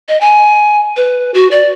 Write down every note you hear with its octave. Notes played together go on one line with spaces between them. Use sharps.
D#5
G#5
B4
F#4
D5